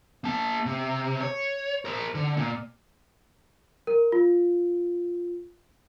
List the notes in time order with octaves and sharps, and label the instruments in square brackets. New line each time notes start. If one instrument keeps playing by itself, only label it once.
[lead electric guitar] A#3 A5
C3
C#5
A#4 C5
D3
A#2
[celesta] A#4
F4